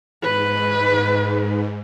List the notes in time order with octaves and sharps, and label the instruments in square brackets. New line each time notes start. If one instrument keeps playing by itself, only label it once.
[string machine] G#2 [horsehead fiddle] B4